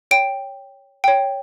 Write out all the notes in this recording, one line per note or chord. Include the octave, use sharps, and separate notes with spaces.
C#5 G5 D7
C#5 G5